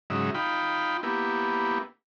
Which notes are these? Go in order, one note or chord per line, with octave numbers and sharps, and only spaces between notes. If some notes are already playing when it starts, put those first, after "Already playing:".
G#2 C#3 F#3 D#4 E5
D#4 F4 G5 B5
A#3 B3 E4 G4